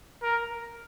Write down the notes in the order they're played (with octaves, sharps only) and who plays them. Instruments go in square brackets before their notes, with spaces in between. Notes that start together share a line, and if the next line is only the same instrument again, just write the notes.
[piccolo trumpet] A#4